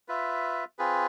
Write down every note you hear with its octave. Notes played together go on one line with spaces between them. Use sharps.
F4 B4 E5
C4 F4 G#4 B4